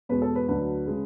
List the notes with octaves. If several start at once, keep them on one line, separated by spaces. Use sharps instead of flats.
E2 B2 G#3 B4
A4
B4
D2 D3 F#3 B4
C#3 G#3